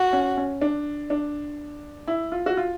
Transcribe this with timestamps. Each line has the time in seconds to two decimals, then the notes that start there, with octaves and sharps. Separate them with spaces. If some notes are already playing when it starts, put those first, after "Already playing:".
Already playing: F#4
0.13 C#4
0.37 C#4
0.61 D4
1.10 D4
2.08 E4
2.32 F4
2.46 F#4
2.57 F4